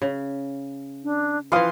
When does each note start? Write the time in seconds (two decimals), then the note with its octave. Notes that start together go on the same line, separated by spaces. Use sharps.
0.02 C#3
1.04 D4
1.52 E3 F3 B4 F5 C6 D#6